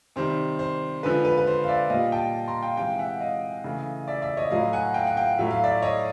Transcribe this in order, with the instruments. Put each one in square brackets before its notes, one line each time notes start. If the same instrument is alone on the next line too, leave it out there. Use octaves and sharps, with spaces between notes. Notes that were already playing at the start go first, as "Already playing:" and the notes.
[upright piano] C3 D#3 G3 C5
C5
D3 F3 G#3 B4
B4
B4
C5
F5
D5 E5
A#2 G3 D#5 F5
G5 A5
A#5 C6
F5 G5
C3 E3 G#3 F5 G5
E5 F#5
D#5 F5
C#3 E3 A3
D5 E5
D5 E5
C#5 D#5
A2 F#3 A3 D#5 F5
F#5 G#5
F5 G5
F#5
F5 G5
A2 F#3 A3 E5
F5
D5 E5
C#5 D#5